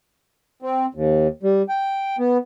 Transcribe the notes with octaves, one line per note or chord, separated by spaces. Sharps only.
C4
D#2
G3
G5
B3